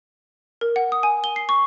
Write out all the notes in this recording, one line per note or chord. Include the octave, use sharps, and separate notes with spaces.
A#4
F#5
D#6
G#5
G7
C7
C#6